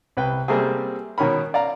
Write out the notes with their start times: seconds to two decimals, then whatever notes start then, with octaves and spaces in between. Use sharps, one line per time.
0.17 C2 B4 G5
0.48 C3 G3 A3 A#3 C4 G#4
1.18 B2 D#3 C#4 A#4 B5
1.54 D5 F5 A#5